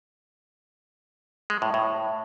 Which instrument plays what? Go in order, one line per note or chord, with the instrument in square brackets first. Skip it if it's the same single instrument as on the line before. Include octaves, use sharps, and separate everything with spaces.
[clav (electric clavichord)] G#3
A2
A2